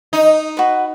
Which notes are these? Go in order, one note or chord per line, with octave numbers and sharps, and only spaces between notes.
D#4
F#4 B4